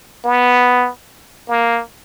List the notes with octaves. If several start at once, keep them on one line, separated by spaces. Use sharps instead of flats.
B3
A#3